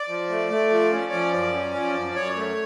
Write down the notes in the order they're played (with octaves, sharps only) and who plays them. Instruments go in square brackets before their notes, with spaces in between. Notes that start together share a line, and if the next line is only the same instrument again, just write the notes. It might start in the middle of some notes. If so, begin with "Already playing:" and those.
Already playing: [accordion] D5
F3
A3
A3
F3
C#4
F3
F#2
C#4
F3
F#2
F#2 C#5
A3